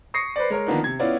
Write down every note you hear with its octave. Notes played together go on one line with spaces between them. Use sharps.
C#6 D#6 A#6 C7 C#7
B4 C5 D5
G#3 A#4 C#5
D#3 F3 A#3 B3 D4 D#4
C3 G#6
B3 C#4 E4 F4 D5